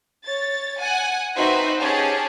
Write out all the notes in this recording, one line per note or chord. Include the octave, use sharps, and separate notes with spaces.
C#5 A6
F#5 G#5
C4 D#4 F#4 B4 C5 E5
C#4 G4 G#4 C#5 A5